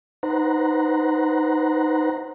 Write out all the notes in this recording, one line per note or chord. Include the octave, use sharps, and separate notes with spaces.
D#4 B4 C5 F#5 A#5